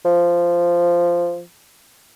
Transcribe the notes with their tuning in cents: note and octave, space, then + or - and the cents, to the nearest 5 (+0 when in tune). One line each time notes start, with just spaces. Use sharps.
F3 -10